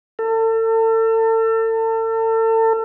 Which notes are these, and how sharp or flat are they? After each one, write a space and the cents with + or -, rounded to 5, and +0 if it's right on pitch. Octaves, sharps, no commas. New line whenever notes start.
A4 +35